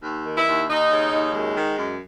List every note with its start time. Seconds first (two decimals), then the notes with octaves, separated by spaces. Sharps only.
0.03 D#2
0.26 D#3
0.36 E4
0.47 D#2
0.69 D#2 D#4
0.91 C#3
1.12 D#2
1.34 F#2 G#3
1.56 D#3
1.77 F#2